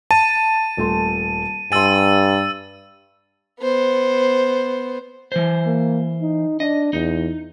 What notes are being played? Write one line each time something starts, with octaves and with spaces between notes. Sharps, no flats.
A5 D#7
D#1 A3 C6
G2 G#5 C6 E6 A6 D#7
B3 C5
E3 C5
A#3
D#4
D4 D#5
E2 D#4